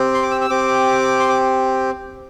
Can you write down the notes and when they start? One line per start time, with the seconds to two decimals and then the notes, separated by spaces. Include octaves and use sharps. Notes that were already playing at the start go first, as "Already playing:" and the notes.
Already playing: C4 G4
0.14 C6
0.22 D6
0.31 E6
0.41 E6
0.50 C4 G4 D6
1.19 C6
1.29 D6